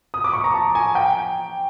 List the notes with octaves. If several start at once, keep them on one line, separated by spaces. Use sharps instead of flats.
D#6
D6
C#6
A#5
A5
G#5
G5